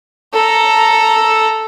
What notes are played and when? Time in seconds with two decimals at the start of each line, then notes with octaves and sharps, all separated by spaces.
0.33 A4 A#5